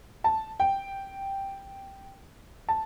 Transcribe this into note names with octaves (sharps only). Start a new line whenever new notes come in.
A5
G5
A5